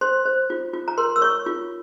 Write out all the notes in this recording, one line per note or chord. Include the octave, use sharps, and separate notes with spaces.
C5 C6
C5
F4
F4
A#5
A#4 C6
E6
C#5 C#6
F4